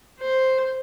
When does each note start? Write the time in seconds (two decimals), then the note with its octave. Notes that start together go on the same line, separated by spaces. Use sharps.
0.20 C5